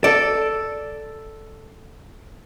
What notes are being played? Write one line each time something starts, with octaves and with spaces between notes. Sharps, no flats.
A4 D5